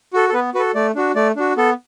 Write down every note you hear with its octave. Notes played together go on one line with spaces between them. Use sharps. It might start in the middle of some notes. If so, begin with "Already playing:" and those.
F#4 A4
A4
B3 B4
F#4 A4 B4
A3 D5
D4 F#4
A3 D5
D4 F#4
B3 A4